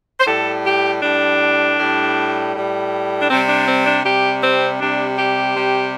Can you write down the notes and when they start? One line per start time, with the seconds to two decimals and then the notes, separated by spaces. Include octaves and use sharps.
0.19 C5
0.26 A2 G3 A4
0.64 G4
1.02 A2 G3 D4
1.77 A2 G3
2.53 A2 G3
3.21 D4
3.28 C3 G3 C4
3.48 D4
3.67 C4
3.85 D4
4.03 C3 G3 G4
4.42 C4
4.80 C3 G3 D4
5.18 G4
5.55 C3 G3